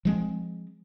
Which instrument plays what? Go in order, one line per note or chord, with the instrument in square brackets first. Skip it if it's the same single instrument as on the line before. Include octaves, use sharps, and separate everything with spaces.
[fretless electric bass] F3 G#3 C4